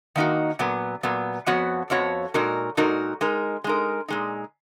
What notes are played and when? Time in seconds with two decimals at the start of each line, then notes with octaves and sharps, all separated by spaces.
0.16 D#3 A#3 D#4 F#4
0.59 A#2 F#3 B3
1.03 A#2 F#3 B3
1.46 F2 F3 B3 F#4 C#5
1.90 F2 F3 B3 F#4 C#5
2.34 A#2 G#3 D#4 F#4 A#4
2.77 A#2 G#3 D#4 F#4 A#4
3.21 G#3 D#4 A#4
3.64 G#3 D#4 A#4
4.08 A#2 G#3 D#4